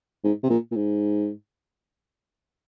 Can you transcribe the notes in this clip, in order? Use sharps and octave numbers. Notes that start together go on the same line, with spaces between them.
G#2
C3
A#2
A#2
G#2